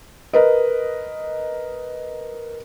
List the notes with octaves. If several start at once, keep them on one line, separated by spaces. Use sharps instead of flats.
A#4 B4 D#5